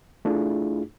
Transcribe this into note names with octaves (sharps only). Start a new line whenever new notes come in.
A3 D4 E4 F4 G#4